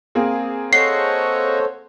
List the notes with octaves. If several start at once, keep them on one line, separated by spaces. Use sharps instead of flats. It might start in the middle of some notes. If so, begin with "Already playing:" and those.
A#3 C4 G#4
A4 C5 C#5 D#5 F#5 C#6 C7